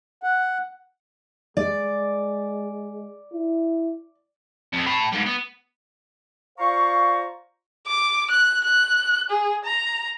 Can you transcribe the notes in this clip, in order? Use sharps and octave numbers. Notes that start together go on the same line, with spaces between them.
F#5
G#3 D5
E4
F2 C4
A5 B5
G#2 G3
B3
F4 C5 D5 F5 A#5 C#6
D6
F#6
F#6
G#4
A#5